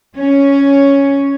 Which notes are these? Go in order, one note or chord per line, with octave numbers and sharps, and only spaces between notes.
C#4